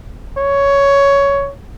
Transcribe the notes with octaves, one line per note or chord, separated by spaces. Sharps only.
C#5